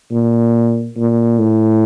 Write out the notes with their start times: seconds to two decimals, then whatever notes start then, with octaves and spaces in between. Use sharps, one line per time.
0.11 A#2
0.97 A#2
1.39 A2